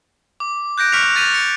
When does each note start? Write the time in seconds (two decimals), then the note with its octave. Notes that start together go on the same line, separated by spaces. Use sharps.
0.40 D6
0.78 F#6 G6 A#6 D7
0.92 C#6 F6 B6 C#7 D7 F7
1.15 G6 A6 B6 D#7 F7
1.34 C#7